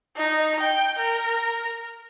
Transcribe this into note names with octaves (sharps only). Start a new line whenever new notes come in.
D#4
G5
A#4